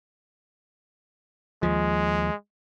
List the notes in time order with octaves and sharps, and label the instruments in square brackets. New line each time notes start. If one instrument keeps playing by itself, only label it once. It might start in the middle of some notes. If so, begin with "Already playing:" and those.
[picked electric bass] D#2 F3 [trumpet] G#3